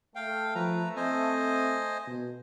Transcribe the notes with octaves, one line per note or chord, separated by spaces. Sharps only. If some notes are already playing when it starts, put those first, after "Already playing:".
A3 F5 G5
F3 B4 A#5
C4 C5 D#5 G#5
B2